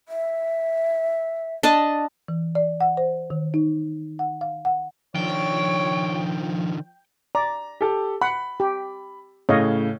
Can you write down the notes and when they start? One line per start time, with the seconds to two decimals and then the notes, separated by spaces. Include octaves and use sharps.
0.09 E5
1.63 D4 D#5 A5
2.28 E3
2.55 D5
2.81 F#5
2.97 C5
3.30 D#3
3.54 D#4
4.19 F#5
4.41 F5
4.65 F#5
5.15 D#3 F3 D4 C#5 G5
7.35 D5 A#5
7.81 G4 A4
8.21 F#5 B5
8.60 G4
9.49 A2 C#3 C#5 D#5 F5